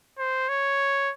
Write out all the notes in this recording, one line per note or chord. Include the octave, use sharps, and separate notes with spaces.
C5
C#5